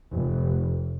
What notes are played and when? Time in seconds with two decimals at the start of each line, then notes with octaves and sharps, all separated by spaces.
0.13 F1